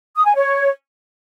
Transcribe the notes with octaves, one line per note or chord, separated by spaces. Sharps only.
D#6
G#5
C#5